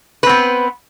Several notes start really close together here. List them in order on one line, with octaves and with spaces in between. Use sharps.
B4 C4 B3